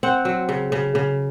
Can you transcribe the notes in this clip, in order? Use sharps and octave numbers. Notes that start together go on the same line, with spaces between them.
C4 F#5
F#3
C#3
C#3
C#3